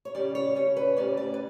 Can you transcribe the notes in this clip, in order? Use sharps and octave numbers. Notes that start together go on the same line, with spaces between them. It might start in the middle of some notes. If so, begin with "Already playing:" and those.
C#5
C#3 G3 C#4 D5
C#5
C#3 G3 C#4 C#5
B4
D2 C#3 G3 C#4 D5
D5
B4